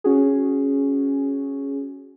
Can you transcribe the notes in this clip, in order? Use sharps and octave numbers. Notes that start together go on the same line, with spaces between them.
C#4 F#4 G#4